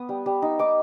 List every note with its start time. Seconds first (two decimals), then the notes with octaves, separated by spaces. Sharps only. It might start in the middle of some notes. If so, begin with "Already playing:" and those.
Already playing: B3 D#6
0.09 G3
0.26 G3
0.42 D#4
0.59 D#4 D6